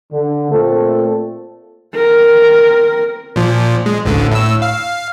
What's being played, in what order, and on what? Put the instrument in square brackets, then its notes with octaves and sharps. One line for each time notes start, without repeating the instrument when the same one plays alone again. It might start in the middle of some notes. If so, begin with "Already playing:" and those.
[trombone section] D3
A#2 A3 C4 A4
[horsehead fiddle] C4 A#4
[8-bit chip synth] A#2 F3
G#3
A1 D2 D3
A2 E6
F5